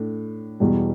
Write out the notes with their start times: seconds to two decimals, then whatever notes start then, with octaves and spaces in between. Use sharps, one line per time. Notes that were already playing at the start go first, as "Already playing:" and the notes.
Already playing: A2 D4
0.60 E2 B2 G3